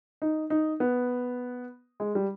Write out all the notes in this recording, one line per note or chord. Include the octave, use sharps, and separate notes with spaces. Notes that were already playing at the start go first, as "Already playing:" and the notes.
D#4
D#4
B3
G#3
G3